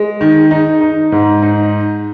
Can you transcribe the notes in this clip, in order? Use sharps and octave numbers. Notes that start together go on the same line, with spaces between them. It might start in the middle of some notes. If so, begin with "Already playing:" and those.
Already playing: G#3
D#3
D#4
D#4
G#2
D#4